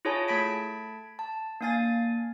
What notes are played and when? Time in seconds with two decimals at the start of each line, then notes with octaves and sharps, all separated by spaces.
0.05 E4 F4 G#4 C#5 G#5 A5
0.28 A3 A5 B5 G#6 B6 D7
1.19 A5
1.61 A#3 D4 F5 G#5 A6